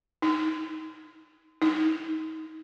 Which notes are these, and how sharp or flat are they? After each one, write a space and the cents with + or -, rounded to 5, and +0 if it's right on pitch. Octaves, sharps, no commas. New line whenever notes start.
D#4 +25
D#4 +30